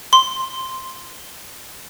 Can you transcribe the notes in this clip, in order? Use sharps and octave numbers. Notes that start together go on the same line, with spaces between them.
C6